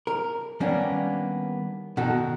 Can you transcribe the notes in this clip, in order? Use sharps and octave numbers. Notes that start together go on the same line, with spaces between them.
A#4
D#3 G3 A#3 B3 C#4 D4
B2 D#3 F#4 A4